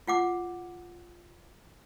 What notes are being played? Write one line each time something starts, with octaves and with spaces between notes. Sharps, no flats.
F4 F#5 D6